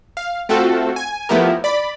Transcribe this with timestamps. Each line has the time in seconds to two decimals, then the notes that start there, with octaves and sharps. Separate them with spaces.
0.17 F5
0.49 A3 C4 F4 F#4 A4
0.96 G#5
1.29 F3 A3 B3 E4 G4 A#4
1.64 D5 B5